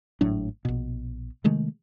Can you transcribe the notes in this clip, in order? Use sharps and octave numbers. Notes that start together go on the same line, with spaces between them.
G#1 A2 F#3 D4
A#1 B2
C3 D#3 G#3 A3